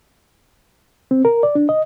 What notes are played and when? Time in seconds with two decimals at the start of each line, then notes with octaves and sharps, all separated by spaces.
1.11 C4
1.25 A#4
1.43 D5
1.55 D4
1.69 D#5